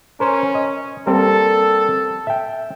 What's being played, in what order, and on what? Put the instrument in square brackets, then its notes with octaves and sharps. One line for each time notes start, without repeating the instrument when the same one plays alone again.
[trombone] C#4 [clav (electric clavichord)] A#4 C5
[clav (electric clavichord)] D#5
[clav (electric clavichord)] G3 A#3 C4 [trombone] A4
[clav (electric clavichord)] E5 G5